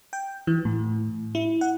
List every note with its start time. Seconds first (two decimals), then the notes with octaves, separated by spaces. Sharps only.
0.13 G5
0.47 E3
0.65 A2
1.35 E4
1.61 F#5